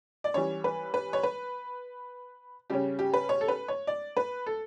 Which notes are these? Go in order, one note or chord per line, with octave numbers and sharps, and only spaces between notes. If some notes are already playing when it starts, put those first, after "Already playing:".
D5
E3 G3 C#4 C#5
B4
B4
C#5
B4
C#3 G3 C#4 G4
G4
B4
C#5
A4
B4
C#5
D5
B4
A4